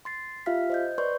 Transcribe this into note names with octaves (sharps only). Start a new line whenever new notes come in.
C6 A6 C7
F4 G4 E5 F5 F6 B6
C5 D#5 G6
B4 D5 C6 C#6 G6